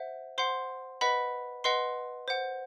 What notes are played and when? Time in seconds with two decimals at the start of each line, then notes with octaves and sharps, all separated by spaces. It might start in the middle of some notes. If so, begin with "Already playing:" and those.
Already playing: C5 E5 F#5
0.38 C5 F#5 C6 C7
1.01 B4 D#5 F#5 B5 B6
1.64 B4 D#5 F#5 C6 C7
2.28 C5 F#5